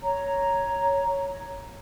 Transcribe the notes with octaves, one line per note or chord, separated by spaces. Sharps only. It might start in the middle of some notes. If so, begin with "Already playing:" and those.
C#5 A#5